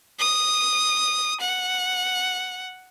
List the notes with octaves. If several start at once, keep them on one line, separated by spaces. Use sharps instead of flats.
D#6
F#5